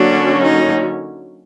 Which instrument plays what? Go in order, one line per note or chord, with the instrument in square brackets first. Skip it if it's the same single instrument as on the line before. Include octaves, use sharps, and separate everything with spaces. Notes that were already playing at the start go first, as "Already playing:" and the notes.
Already playing: [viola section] D3 F#3 A#3 C#4 F#4 [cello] D4
[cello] D#4